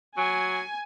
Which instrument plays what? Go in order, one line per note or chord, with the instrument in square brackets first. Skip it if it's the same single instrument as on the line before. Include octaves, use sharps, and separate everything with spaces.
[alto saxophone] F#3 [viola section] G#5